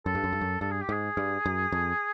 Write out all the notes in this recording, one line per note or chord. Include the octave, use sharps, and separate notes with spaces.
F#2 A4
G2
F#2
G2
F#2
G2 A4
G#4
G4
G#2 G#4
G2
F#2
F2